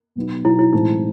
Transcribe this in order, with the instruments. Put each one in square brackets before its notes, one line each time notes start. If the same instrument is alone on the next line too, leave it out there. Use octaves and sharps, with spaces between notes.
[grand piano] B2 F#3 B3 D#4
[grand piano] B2 F#3 B3 D#4 [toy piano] E4
[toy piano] E4
[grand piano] A2 E3 G#3 C4 [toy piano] D#4